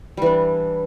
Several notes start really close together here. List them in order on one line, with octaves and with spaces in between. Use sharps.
G3 E3 D4